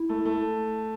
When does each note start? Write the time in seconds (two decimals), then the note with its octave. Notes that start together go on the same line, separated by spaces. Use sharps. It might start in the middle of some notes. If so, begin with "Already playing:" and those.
Already playing: E4
0.09 A3
0.25 A3